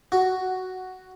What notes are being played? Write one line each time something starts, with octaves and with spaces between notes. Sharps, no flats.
F#4